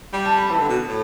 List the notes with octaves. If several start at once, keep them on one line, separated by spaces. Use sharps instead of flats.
G3 G5
A5
B5
E3 A5
D3
B2
A2